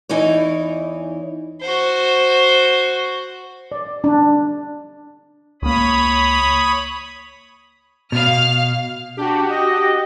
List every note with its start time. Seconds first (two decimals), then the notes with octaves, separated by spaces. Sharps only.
0.09 E2 E3 D#4 E4 C#5
1.61 F#4 C5
3.72 D5
4.04 D4
5.62 C#2 A#3 C#5 B5 D#6
8.12 B2 F5 F6
9.17 D4 F#4 G4
9.49 D#5